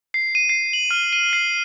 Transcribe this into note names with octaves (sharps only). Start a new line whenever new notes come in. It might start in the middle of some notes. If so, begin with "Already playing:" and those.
C7
D#7
C7
F#7
F6
D#7
C7